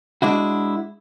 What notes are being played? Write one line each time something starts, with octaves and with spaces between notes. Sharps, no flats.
G#3 D4 E4 F#4